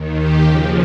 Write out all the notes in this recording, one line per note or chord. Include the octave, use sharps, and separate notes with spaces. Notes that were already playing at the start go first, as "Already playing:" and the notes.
Already playing: D#2 D#3
G4
D#2 C#3 F3 D#4